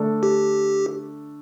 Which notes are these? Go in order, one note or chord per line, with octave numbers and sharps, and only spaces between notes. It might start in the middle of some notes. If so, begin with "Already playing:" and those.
Already playing: D3 A3 D4 A4
G4